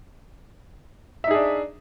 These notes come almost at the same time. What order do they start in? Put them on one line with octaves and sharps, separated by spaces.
E5 D#4 G#4 D4